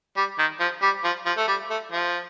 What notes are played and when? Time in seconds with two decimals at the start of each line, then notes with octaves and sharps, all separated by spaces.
0.17 G3
0.38 D#3
0.60 F3
0.82 G3
1.04 F3
1.26 F3
1.37 A3
1.47 G3
1.70 A3
1.92 F3